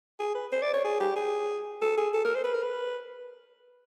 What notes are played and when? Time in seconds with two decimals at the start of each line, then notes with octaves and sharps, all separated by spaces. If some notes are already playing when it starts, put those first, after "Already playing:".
0.20 G#4
0.35 B4
0.52 C5
0.62 D5
0.73 C#5
0.85 G#4
1.00 G4
1.16 G#4
1.82 A4
1.97 G#4
2.14 A4
2.25 A#4
2.35 C5
2.44 B4
2.54 A#4
2.63 B4